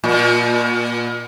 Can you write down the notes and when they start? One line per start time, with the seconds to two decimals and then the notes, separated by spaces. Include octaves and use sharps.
0.04 A#2